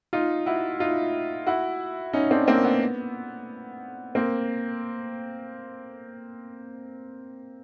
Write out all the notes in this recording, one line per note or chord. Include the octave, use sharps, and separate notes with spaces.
D#4 F4
E4 F#4
D#4 F4
E4 F#4
C#4 D#4
C4 D4
A#3 C4
B3
A#3 C4